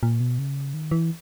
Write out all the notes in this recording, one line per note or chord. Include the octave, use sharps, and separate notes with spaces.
A#2
B2
C#3
D#3
E3